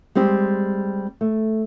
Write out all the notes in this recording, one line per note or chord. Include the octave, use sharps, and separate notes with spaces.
G3 G#3 C4 G4
A3